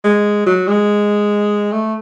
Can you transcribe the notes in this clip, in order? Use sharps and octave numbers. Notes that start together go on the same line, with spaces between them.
G#3
F#3
G#3
A3